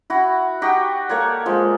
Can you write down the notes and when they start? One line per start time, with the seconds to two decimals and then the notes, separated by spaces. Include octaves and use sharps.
0.10 E4 F#4
0.62 D#4 F#4 G4
1.09 A#3 A4 C#5 D5
1.46 F3 G#3